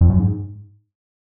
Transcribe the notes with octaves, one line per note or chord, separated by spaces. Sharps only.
F2
F#2
G#2